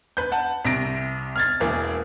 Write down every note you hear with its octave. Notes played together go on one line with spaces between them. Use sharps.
B4 G6
F#5 A5
C2 C3 A#6 D7
F6 G#6 A6
E1 E3 A#3